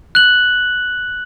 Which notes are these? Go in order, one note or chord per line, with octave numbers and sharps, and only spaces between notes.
F#6 F#7